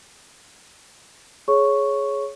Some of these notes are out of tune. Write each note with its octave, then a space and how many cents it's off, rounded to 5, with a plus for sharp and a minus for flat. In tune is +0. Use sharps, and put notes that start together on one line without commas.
G#4 +15 C#5 +0 C#6 +0